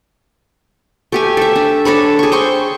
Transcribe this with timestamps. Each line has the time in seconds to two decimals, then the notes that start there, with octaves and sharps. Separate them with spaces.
1.12 A3 G4 G#5
1.37 A4 E5
1.56 D4
1.85 D4 A4 C#5 B5
2.19 G#4 C#6
2.32 C5 G5 C6 C#6